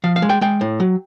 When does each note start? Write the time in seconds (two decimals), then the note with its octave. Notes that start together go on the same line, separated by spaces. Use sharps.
0.04 F3 F5
0.16 F5
0.22 G#3
0.29 G5
0.41 G#3 G5
0.61 A2
0.80 F#3